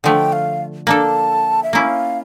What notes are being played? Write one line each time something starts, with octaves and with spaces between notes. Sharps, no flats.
D3 F3 A3 G5
F5
A#3 D4 A4 A5
E5
A#3 C#4 E4 F5